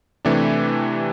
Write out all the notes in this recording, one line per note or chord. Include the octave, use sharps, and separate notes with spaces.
C3 E3 A3 D4 G4